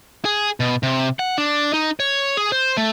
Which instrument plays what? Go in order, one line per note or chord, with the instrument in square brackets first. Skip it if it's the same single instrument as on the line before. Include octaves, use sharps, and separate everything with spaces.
[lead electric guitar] G#4
B2
C3
F#5
D4
D#4
C#5
G#4
C5
A3